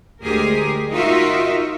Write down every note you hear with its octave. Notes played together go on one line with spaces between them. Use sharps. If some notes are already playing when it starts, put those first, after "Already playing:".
D2 G#3 G4 G#4 A#4
D#4 F4 F#4 A#4 D#5 E5